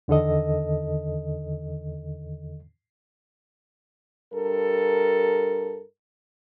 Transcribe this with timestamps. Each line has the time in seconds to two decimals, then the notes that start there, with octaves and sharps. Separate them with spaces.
0.08 E2 D3 D#3 A4 D#5
4.34 G2 A4 A#4